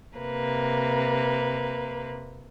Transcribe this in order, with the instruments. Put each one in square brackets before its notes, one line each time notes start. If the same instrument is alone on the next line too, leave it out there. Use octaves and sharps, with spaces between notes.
[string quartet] C3 A#3 B4